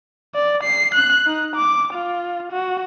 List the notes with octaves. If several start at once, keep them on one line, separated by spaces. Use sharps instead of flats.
D5
C7
F#6
D#4
D6
F4
F#4